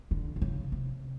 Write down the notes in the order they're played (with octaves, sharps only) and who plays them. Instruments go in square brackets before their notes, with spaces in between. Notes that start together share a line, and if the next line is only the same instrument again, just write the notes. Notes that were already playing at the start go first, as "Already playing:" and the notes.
[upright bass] D3
D3
C#3
C3